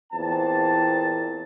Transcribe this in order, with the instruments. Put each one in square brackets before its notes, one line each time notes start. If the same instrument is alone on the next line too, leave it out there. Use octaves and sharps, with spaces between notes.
[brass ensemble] E2 A#2 C4 A5